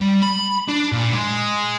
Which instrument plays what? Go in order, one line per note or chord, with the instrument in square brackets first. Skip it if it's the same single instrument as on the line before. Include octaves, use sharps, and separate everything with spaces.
[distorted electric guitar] G3
B5
D4
A#2
G#3